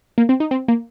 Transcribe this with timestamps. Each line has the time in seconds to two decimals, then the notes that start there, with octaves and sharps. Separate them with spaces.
0.18 A#3
0.29 C4
0.40 D#4
0.51 C4
0.68 A#3